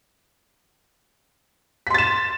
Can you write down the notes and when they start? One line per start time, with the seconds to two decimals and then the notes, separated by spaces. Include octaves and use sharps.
1.87 B6
1.91 C6
1.94 A6
1.98 E7